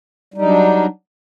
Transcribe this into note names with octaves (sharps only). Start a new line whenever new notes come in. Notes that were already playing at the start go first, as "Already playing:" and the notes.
F#3 G3 D4 D#4